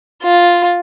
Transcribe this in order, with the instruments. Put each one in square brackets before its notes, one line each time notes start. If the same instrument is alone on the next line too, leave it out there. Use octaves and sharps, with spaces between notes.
[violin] F4